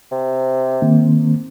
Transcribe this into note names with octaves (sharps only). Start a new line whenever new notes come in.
C3
D#3 A#3 C4